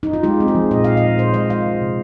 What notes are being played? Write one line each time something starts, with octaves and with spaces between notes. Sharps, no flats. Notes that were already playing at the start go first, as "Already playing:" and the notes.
D#4
F4
G#3 G4
C4
G#4
F3
A#2 D#5
A#2 F5
D#5
A#2
A#2 C5
G#3 D#5
G#3 F5
D#3
C3